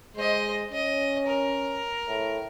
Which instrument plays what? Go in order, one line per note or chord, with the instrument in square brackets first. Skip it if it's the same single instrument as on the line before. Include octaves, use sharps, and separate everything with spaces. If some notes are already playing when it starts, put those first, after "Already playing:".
[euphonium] G#3 [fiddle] C5 D#5
[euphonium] C#4 [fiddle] D#5
[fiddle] A#4
[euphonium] A2